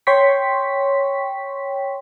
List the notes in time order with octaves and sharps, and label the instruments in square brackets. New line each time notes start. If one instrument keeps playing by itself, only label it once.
[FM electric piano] C#5 G5 C6 C#6 B6